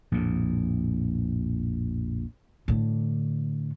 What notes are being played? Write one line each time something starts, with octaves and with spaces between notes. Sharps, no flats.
A#1 F2 A2
A2 D3